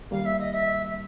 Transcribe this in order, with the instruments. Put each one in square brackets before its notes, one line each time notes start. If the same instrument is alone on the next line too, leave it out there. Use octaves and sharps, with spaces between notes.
[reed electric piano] D#3 G3 A#3 [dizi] F5
[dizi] E5
D#5
E5